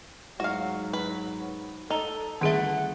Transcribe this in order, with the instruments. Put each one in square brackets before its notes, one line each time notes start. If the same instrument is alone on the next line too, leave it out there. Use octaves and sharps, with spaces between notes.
[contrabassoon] G#2 [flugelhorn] F#3 [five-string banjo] F#4 F5
[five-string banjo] B4
[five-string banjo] D#4 [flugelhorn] A4 [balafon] A#5
[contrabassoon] G1 [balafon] D#3 G#4 [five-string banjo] A3 B4 [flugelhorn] F#5